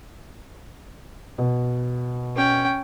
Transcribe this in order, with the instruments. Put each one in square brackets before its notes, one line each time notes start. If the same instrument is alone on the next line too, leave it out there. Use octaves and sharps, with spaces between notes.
[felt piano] B2
[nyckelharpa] C#4 G5